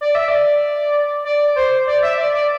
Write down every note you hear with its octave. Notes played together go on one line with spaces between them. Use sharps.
D5
E5
D5
D5
C5
D5
E5
D5
D5